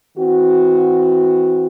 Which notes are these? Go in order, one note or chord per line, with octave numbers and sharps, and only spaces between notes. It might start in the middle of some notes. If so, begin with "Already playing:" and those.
E3 C4 F#4